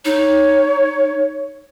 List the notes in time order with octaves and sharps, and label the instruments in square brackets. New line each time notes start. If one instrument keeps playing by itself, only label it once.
[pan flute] D#4 [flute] C#5